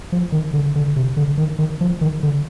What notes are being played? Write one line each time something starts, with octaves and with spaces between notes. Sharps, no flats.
F3
D#3
D3
D3
C3
D3
D#3
D#3
F3
D#3
D3